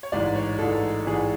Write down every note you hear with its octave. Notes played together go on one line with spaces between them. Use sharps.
C#5
A1 G#2 E3 D5
C#5
A1 G#2 E3 A4
A1 G#2 E3 G#4